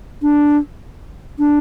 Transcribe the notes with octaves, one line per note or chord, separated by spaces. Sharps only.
D4
D4